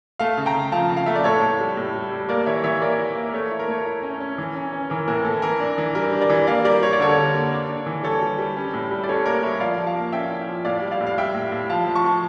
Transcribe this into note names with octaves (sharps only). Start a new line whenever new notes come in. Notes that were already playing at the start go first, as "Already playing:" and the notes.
A3 F5 A5
C#3
G5 A#5
C#3
F3 F5 A5
C#3
F5
A3 E5
D5
A2 A4 C#5
A2
G3
A2
G3
G3
A#3 A#4 D5
E3 C#5 E5
E3 C#5 E5
A#3 A#4 D5
E4
A#3
A#4
A3 A4 C#5
E4
A#4
A3 C#5
E4 A#4
C#4
C#4
E3
C#4
C#4
E3 A#4
A2 A#4
A2 A4
E3 A#4
D4
E3
G3 A#4
D4
A#4 D5
E3
A#3 D5 F5
G3 A#4 D5
G3 C#5
D5
D3 A4 C#5
D3
A#3
D4
D4
E3
G3 A4 C#5
G3
G3
C#4
A2
G3
D5
C#4 A4 C#5
A#3 A#4 D5
G3 C#5 E5
F3 D5 F5
F3
F5 A5
A#3
C#4 E5 G5
E4
F3
A2 D5 F5
G3
D5 F5
A2
F5
G3 E5 G5
A2
A2
F3 F5 A5
F3
A5 C#6
F3